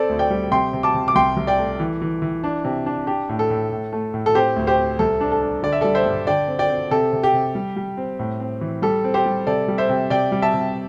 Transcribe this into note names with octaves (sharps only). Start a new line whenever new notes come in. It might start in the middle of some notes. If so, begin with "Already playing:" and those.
Already playing: C4 A4 D5
D2
D5 G5
G3
C3 G5 C6
C3
A5 D6
C3
D6
C2 G5 C6
C2
D5 G5
A3
E3
E3
E3
D4
C3
D4
D4 G4
A2
A4
A2
A2
A3
A2
A4
C4 G4 C5
D2
G4 C5
C4
C2 A4
D4
A4
D4
D3 D5
E5
G3 A4 D5
C5 E5
G2
D3 D5 G5
C4
D5 G5
C4
C3 A4
C3
G4
C3
G3
G3
C4
A2
C4
E3
G3 A4
C4
G4 C5
G3
C3 A4 D5
G3
C5 E5
C3
C3 D5 G5
G3
E5 A5
C3